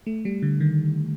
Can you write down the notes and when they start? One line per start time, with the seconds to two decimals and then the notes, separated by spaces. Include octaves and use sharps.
0.07 A3
0.25 G3
0.42 D3
0.60 D#3